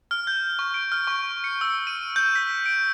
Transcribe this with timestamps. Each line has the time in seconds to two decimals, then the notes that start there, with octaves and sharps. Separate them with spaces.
0.11 F6
0.27 G6
0.59 C#6
0.74 D7
0.92 F6
1.07 C#6
1.44 C#7
1.61 E6
1.87 D#7
2.16 G6
2.35 B6
2.66 D7